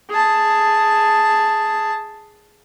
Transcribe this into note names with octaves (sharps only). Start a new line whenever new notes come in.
G#4 A5